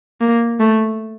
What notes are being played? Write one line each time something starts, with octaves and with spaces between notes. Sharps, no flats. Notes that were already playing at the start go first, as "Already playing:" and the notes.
A#3
A3